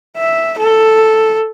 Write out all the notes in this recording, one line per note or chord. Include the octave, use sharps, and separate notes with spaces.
E5
A4